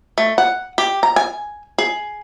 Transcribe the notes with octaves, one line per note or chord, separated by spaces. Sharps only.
A3
F#5
G4
A#5
G#5
G#4